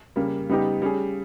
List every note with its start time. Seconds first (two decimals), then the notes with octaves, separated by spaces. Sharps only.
0.16 C#3 G3 A#3
0.49 C#3 G3 B3 D#4 G4
0.82 G3 C#4 G#4